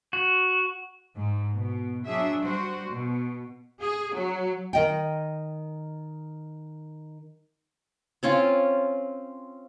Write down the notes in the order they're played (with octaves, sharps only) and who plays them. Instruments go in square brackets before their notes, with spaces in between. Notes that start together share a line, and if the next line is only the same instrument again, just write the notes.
[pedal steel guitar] F#4
[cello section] G#2
B2
F#3 D4 G#4 E5
G3 F#4 C5
B2
G#4
F#3
[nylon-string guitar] D#3 D#5 G5
[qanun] C4 C#4 F4